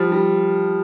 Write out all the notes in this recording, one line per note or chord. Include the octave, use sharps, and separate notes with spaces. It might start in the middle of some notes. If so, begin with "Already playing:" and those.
Already playing: F3 G3
G3